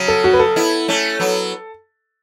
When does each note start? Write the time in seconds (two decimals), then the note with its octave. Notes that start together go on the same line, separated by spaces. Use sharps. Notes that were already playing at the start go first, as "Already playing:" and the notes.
Already playing: C#3 F#3
0.08 A4
0.24 F#4
0.33 B4
0.39 A4
0.56 B3 E4
0.88 A3 C#4
1.20 F#3 B3